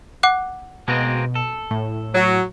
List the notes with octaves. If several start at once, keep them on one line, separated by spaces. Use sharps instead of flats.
F#5 D6 F#6
B2 G#3 A#3 C4
A4
A2
F#3